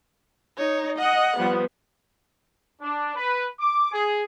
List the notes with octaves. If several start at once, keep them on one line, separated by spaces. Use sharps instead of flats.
D#4 C#5
D#5 F#5
F3 G3 B3
D4
B4
D6
G#4